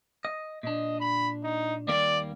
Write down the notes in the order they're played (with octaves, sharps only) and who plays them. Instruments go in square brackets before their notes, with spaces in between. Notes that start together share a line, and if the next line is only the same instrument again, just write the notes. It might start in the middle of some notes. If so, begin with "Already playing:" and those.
[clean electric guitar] D#5
[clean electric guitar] A#2 D4 [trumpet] D#5
[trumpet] B5
D#4
[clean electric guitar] D#2 G3 A#3 [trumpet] D5